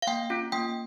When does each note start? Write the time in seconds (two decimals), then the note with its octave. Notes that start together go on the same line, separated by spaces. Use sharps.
0.02 F5
0.07 A#3 G5
0.30 C#4 F4
0.52 A#3 G5